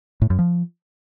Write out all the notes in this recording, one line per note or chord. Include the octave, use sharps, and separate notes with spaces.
A2
F#2
F3